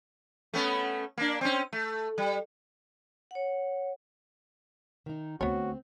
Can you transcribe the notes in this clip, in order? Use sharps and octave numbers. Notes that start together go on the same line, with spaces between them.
A3 B3 C#4
A#3 D4
C4 C#4
A3
G3
C#5 F#5
D#3 D#4
D2 B3 C4 F#4 C#5